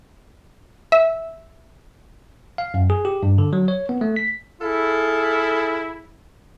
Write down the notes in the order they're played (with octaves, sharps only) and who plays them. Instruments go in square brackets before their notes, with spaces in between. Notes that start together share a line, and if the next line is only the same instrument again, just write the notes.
[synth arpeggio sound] E5
[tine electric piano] F5
F#2
G#4
G4
G2
D3
F#3
C#5
B3
A3
B6
[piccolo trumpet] E4 [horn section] G#4 A4 F5